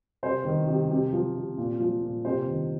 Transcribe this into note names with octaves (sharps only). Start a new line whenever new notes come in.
C3 C5
D#3
C3
C3
F3
C3
A#2
F3
A#2
C3 C5
D#3